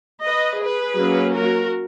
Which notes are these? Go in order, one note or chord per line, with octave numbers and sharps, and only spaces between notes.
B4 D#5
G#4 B4
F#3 A#3 C#4
F#4 A#4